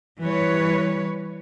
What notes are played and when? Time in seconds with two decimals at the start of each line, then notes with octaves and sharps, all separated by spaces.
0.22 E3 G3 B4 C#5